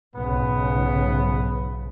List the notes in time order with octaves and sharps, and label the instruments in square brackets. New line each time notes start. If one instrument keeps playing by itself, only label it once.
[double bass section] B1 G#2 C#3 [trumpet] B3